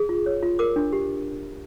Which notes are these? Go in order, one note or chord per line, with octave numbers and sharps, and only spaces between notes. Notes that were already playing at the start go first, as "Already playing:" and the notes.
Already playing: G#4
F4
C#5
F4
A#4 D6
D4
G4